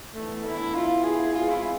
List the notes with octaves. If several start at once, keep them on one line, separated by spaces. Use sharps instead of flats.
E3 A3 B3 D4
E4
E3 B3 E4 F4
G#4
G#3 C4 F4 G#4 C5
E4